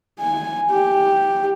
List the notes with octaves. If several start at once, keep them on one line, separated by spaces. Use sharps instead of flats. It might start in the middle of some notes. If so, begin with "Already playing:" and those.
G#5
G4